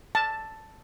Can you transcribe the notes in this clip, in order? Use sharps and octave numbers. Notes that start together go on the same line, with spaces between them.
A5